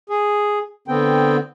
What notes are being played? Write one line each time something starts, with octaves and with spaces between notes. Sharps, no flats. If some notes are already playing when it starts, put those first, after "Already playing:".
G#4
D3 B3 C4 G5